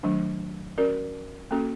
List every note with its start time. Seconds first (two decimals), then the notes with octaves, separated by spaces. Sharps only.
0.03 D#3 F#3 A3 D4
0.78 C#4 F#4 A#4 D5
1.51 A#3 C#4 F#4 A4